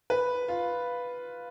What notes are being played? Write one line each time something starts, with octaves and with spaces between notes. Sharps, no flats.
B4
F4